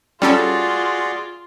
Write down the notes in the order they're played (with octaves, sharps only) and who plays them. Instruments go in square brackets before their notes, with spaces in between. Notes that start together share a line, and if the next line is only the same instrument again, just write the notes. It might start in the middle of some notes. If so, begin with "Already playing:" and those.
[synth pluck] G3 C#4 A4 [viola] F4 [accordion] F#4 G#4 D5